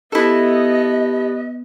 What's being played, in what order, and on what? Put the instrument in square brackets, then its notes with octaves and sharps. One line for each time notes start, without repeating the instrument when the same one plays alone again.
[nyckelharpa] B3 [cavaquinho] E4 A4 [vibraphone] G4 [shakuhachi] D#5